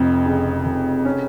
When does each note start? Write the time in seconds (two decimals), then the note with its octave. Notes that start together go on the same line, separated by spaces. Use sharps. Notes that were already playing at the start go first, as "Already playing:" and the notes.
Already playing: F1 F2
0.26 C#3
0.65 F1
1.05 C#4